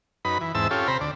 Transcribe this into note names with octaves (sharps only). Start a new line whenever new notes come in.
F#2 D#4 B4 B5
E3
E2 G#2 C4 E5 A5 E6
C#4 F4 G4 A4
C3 C5 A#5 B5
D2 D5